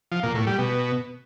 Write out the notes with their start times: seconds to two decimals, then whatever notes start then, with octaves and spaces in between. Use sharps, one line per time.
0.12 F3
0.23 A#2
0.35 A2
0.47 G3
0.59 B2